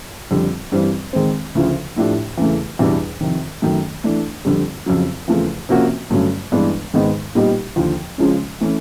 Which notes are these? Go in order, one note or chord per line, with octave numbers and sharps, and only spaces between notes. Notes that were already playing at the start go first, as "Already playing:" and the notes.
F2 D3 G3
G2 E3 G3 C4
D#3 G#3 C4
D2 C#3 F3
A2 F3 A3 D4 G4
E2 C#3 E3 A3
E2 B2 G3 B3 D4
F2 C3 D#3
F#2 D#3 F#3 A3
E3 A3 D4
F2 D3 G3
F2 C#3 F#3
E2 C#3 F3 A3
C3 F3 A#3 C#4 F#4
G2 D3 F#3 A3 C#4
G2 E3 G#3 B3 D4
G#2 D#3 G#3 B3 D#4
A#2 G3 B3 D#4 G4
D#2 D3 F3
C#3 F3 G#3 C#4
E3 A3 C#4 E4